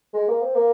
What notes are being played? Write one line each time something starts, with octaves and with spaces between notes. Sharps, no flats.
G#3
A#3
C4
A#3